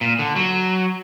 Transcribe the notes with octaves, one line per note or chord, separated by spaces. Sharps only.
A#2
D3
F#3